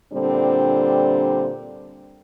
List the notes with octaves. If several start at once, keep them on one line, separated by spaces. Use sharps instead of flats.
A#2 D3 G3 C4 D4